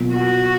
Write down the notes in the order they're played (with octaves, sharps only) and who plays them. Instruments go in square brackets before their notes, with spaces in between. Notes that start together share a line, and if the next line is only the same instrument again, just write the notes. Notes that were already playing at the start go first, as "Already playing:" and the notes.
Already playing: [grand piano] B2 F#3 A#3 F4
[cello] F#4